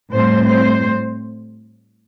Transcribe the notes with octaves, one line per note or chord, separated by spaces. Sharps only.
A2 G3 C4 C5
C5